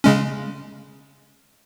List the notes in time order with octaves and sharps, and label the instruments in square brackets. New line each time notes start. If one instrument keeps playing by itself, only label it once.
[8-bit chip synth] C#3 G#3 C#4